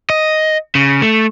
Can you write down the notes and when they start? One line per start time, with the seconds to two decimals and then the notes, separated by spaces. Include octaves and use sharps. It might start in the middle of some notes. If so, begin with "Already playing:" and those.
0.10 D#5
0.75 C#3
1.02 A3